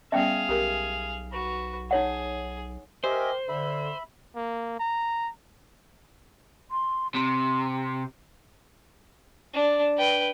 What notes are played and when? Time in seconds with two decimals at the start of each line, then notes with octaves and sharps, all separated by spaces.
0.12 G3 B3 C#4 G#4 E5 F5 G5
0.49 B1 G4 A#4
1.32 F#4 B4
1.91 D#4 G#4 C#5 F#5
3.04 G4 A#4 C5 D#5 E5 G#5
3.49 D3 E5 B5
4.35 A#3
4.80 A#5
6.71 C6
7.15 C3 C6
9.53 D4
9.97 B4 G5